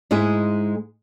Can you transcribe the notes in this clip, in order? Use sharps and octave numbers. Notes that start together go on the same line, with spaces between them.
G#2 G#3 E4 G#4